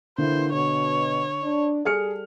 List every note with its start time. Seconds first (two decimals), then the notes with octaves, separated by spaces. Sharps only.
0.18 D3 E3 A#3 E4 C5
0.53 B2 C#5
1.42 D4
1.85 G3 G#4 A4 F6 C#7